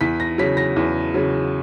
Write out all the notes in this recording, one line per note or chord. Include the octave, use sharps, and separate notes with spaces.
E2 B6
A#6
C#3 F#3 B6
A#6
E2
C#3 F#3